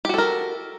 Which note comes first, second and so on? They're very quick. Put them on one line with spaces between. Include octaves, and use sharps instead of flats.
G4 F#4 A4 A#4